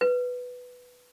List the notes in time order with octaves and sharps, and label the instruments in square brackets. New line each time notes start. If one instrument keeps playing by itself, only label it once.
[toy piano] B4